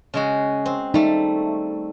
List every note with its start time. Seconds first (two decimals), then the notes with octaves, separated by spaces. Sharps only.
0.14 C#3 G#3 F#4
0.66 C4
0.94 G3 A3 D#4